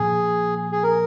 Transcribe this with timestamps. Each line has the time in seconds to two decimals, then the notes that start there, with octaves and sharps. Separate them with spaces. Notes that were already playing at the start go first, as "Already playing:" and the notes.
Already playing: A#2 F3 C4 G#4
0.72 G#4
0.83 A#4